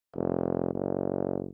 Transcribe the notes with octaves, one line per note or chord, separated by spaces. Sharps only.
F1
F#1